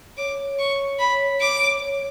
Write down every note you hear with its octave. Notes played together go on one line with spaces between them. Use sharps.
C#5 D6
C#6
B5
D6
C#5